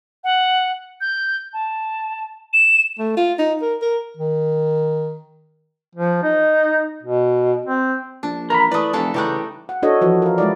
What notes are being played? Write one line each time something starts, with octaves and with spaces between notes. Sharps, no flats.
F#5
G6
A5
E7
A3
F4
D#4
A#4
A#4
D#3
F3
D#4
B2
C4
A#1 D4
E3 A#4 A#5 B5
E3 A3 B4 D5 D#6
F1 E3 A#3 D4 A4
C#3 E3 G3 A3 D#4 G4 F#6
F#5
D4 E4 F#4 A4 C#5 D#5
E3 F3 F#4
A#4 F5
G#3 E4 D5